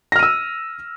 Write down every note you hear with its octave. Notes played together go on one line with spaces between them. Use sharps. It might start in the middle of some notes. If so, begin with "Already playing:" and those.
E6 F6 A#6 D#7